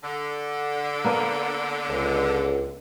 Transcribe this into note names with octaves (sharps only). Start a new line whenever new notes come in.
D3
A#3 B3 D4
C#2